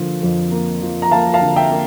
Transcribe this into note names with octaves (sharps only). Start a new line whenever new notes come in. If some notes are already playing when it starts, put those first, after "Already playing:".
Already playing: D3 F3 A#3
F2
A#3
F3
A#5
A#3 F5 A5
F5 A5
D3
E5 G5
A#3